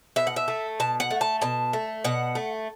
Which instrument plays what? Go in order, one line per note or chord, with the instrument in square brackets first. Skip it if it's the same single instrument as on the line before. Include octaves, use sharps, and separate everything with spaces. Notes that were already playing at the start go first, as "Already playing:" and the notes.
[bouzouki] B2 E5
F#5
E5
A3
B2 A5
F#5
A3
A5
B2 A5
A3
B2 F#5
A3